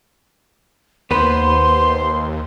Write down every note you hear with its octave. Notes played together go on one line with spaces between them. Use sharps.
D#2 B3 B4 C5 C6